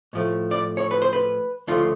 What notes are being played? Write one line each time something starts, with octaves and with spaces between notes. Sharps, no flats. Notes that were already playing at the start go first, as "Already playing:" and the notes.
A2 F3 A3
D5
C#5
B4
C5
B4
D2 C#3 F3 A3 F4